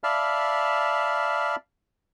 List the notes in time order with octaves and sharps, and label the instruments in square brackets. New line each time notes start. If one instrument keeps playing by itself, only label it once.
[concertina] D5 E5 F5 A5 B5 F6